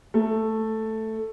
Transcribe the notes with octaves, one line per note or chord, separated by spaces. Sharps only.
A3